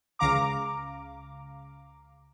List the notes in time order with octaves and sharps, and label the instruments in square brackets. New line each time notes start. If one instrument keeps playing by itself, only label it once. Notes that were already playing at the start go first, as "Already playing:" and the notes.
[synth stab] C#2 C#3 F5 A#5 D6